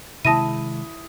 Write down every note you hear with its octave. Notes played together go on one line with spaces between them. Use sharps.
C3 D#3 G#3 E4 A5 D#6 A#6 D#7